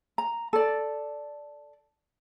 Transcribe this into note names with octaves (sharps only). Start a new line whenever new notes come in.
A#5
A4 D5